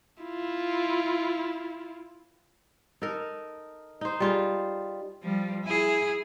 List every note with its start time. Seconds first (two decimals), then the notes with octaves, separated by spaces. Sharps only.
0.23 E4 F4
3.02 D#4 A4 A#4
4.01 D#4 C5
4.20 G3 F4 G#4
5.23 F3 G3
5.64 E4 G#4